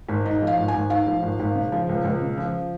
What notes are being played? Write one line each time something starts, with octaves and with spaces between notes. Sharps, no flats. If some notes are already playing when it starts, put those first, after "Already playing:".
G#1
G#2 D#5
F3
F5
G#1
G#5
G#1
G#2 F5
F3
G#1
G#1
C#3
F3
C#2
C#2
C#3
F3